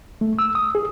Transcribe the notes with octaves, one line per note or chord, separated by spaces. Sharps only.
A3
E6
D#6
G#4